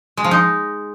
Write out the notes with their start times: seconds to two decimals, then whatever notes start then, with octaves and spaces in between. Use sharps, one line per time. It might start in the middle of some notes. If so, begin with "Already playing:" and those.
0.17 G#3
0.24 F3
0.31 D#4